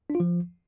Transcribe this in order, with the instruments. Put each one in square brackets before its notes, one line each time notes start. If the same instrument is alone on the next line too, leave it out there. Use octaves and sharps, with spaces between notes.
[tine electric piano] D4
F4
F3